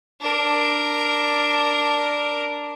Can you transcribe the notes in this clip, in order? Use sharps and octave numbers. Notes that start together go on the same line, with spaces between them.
D4 A#4